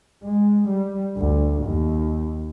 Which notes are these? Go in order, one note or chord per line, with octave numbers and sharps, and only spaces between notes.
G#3
G3
D2
D#2